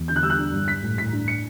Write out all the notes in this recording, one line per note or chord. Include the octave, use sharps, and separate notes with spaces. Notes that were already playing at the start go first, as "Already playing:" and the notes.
Already playing: E2
D3 G6
F#6
G3 E6
F#6
D4
G2
G3 B6
A2
A2 B6
D4
C#7